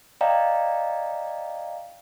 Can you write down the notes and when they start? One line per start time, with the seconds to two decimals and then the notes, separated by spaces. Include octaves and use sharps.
0.21 D5 D#5 F5 G5 A#5